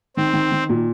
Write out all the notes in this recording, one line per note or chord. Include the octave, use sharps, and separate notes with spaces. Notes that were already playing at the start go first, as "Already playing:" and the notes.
D#3 C4
D#3
D#3
A#2